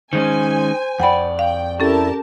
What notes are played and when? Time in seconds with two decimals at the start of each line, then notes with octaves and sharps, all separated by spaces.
0.13 D#3 G#3 C#4 C5 G#5
1.00 F2 D5 F#5 G5 B5
1.39 F5 G5
1.80 C#4 E4 G4 A4 A#4 A5